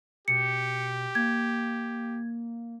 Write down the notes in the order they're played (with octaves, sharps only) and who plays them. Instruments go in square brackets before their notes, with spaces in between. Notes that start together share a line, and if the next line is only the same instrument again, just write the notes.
[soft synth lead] B2 [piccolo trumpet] G4 [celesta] C#7
[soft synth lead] A#3 [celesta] G#6